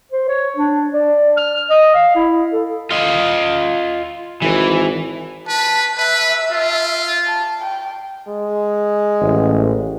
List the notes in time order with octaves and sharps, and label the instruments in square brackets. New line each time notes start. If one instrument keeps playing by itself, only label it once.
[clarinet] C5
C#5
D4
D5
F6
D#5
F5
E4
A4
[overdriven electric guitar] F4 D#5
[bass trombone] G#1 [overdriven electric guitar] E3
[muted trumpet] B4 [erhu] A5
[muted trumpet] B4 [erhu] E5
[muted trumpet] F4
[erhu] A5
G5
[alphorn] G#3
[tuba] A1